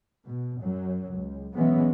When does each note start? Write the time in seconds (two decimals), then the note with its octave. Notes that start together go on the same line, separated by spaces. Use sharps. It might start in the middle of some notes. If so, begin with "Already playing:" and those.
0.24 B2
0.62 F#2 F#3
1.14 C#2
1.56 B1 E3 G#3 B3 C#4